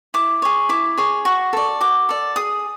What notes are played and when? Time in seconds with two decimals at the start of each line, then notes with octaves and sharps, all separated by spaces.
0.14 E4 D6
0.42 G#4 C#5
0.69 E4 D6
0.97 G#4 C#5
1.25 F#4 C#6
1.53 A4 D5
1.81 F#4 D6
2.09 A4 D5
2.36 G#4 D#6